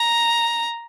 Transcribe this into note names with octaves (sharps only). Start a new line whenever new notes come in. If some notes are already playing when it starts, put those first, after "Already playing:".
Already playing: A#5